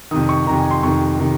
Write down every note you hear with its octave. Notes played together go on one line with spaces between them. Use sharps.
F2 C3 D#3 D#6
C#6
F2 C3 D#3 A#5
G#5
C6
F2 C3 D#3 C#6
C3 D#3